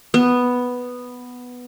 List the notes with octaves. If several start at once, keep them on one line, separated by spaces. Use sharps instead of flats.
B3